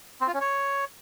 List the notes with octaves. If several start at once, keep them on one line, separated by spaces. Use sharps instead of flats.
C4
F4
C#4
C#5